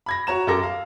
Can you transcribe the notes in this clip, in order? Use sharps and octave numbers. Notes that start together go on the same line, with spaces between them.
B5 G#6 A#6
F#4 C#5 A#5 E7
F#2 G4 A4 A#4 D6 A#6
F5